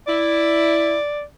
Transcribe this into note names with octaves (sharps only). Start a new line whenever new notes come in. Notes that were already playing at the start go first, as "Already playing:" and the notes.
E4 D5